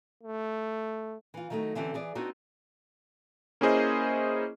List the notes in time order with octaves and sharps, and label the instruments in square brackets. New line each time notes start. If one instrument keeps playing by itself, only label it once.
[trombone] A3
[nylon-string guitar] E3 F4
D#3 F#3 A3 C#4 D#4
D3 E3 C4 C#4 G4
E3 G#4 D5
B3 C4 D4 D#4 F#4
[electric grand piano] A#3 C#4 E4 G#4 C5 D#5